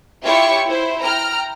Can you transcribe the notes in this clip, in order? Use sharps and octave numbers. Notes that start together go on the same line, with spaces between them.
E4 F4 G4 C#5 E5 C#6
E4 C5
G5 A#5 F6